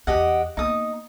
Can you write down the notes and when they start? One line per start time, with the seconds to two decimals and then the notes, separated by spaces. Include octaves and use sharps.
0.07 E2 G4 D#5 F#5
0.57 A#3 B3 D#4 D#6